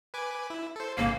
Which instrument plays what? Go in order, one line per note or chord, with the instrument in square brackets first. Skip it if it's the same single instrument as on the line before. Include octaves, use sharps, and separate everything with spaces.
[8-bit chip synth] B4 G#5 D6
E4
A4 C5
[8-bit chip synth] A1 G#2 C#3 [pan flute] A#3